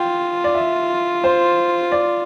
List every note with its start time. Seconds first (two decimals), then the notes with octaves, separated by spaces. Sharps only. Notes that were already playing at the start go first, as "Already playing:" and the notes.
Already playing: F4 G5
0.44 D5
0.54 E5
1.24 C5
1.92 D5